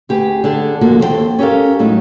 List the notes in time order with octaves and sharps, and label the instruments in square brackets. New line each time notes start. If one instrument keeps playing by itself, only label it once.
[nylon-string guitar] D2 G4 G#4 B4
D3 G#4 A5
D3 F3 A#3 F#4 A4
D#2 G#3 C4 F#4 A4 G5
C#4 G4 A4 A#4 F5
A2 F#3 G#3 A3 D#4